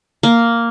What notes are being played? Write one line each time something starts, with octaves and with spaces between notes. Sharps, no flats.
A#3